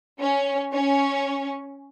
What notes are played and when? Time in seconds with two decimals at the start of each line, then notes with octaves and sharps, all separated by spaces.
0.20 C#4
0.74 C#4